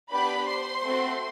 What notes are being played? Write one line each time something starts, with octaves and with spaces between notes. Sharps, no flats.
B3 D4 G4 B4 B5
C5 C6
A3 C4 F#4